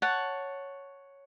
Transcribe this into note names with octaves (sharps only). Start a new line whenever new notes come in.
C#5 F#5 A5